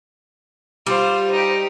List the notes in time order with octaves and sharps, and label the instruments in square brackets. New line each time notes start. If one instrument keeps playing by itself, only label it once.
[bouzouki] G3 [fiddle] F4 C5
[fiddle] D#4 G4